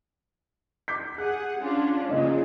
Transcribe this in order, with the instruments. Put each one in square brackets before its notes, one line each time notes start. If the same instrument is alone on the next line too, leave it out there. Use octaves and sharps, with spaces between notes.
[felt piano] D6 G6 B6
[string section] G#4 F#5 [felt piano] F#6
[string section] C#4 D4 F4
[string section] A#2 C#3 G#3 [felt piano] F3 C#4 D#5